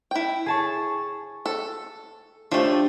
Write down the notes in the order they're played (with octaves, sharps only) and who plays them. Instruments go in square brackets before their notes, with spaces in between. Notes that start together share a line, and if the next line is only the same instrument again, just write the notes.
[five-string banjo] E4 G5
[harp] G#4 A5 C#6
[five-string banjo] A4
[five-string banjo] F3 A3 [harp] D4 G4